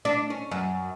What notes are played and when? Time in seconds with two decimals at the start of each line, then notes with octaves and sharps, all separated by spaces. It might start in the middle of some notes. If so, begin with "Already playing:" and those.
0.05 D4
0.30 C#4
0.51 F#2